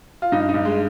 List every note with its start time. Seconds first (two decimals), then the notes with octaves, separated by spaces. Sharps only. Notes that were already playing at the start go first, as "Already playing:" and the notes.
0.22 F4
0.32 G2 D#4
0.49 D#4
0.54 G2
0.65 G#3